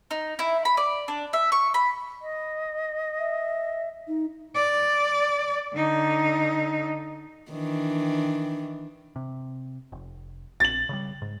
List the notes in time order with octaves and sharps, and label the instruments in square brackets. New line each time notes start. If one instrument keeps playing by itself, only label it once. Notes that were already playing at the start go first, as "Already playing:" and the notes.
[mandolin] D#4
E4
B5
D5
D4
E5
C#6
B5
[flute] D#5
[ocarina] E5
D#4
[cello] D5
D3 D#4
[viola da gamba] D#3 E3 D4
[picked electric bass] C3
F1
[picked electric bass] A#1 [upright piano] A6 F#7
[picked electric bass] C#3 E3 G3
G#2